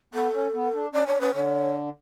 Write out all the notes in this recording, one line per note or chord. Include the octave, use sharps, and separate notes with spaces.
B3 A4
C#4
B3
D4
C#4 D5
D4 C#5
C#4 B4
D3 C#5